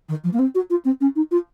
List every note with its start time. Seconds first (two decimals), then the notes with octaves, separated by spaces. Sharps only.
0.09 D#3
0.24 F3
0.33 A#3
0.39 C4
0.55 F#4
0.70 F4
0.85 C4
1.01 C#4
1.16 D#4
1.31 F4